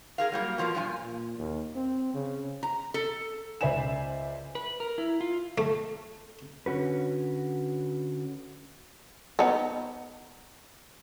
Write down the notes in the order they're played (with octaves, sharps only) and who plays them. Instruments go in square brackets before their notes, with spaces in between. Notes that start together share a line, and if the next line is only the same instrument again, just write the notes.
[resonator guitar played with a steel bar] G#4 A#4 F5
F#3 G3 A#3
B2 F3 G#3 A#3
G2 A#2 F3 G#5
[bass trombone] A#2
D#2
C4
C#3
[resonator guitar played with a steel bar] A#5
A4
[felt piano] C#2 C5 D5 E5 G#5 E7
[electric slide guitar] B4
A#4
E4
F4
[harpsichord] A3
[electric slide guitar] D3 C#4 F#4 B4
[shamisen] B3 D#4